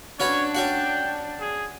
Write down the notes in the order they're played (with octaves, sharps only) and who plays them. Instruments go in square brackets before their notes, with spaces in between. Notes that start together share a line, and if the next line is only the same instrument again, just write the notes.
[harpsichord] C#4 F#4 B4 [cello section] D4 [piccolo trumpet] C#5
[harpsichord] C#4 F#4 F#5 [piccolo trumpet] G5
[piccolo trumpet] G#4